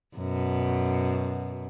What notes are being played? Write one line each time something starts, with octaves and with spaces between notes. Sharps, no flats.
F#2 B2